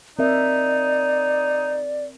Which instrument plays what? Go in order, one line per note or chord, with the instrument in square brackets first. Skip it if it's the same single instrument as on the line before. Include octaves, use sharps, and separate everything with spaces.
[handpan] C4 A#4 E5 [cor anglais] D#4 [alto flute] D5